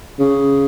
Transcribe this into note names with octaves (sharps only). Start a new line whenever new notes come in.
C#3